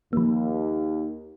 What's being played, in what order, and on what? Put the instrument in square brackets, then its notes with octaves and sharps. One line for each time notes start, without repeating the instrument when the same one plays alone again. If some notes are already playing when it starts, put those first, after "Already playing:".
[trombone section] D#2 [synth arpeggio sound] F3 A#3